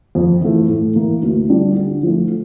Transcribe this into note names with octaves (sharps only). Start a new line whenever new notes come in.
F2
E3 A3
A2
E3 A#3 E4
D2
D3 G3 D4 F4
D3
F3 A3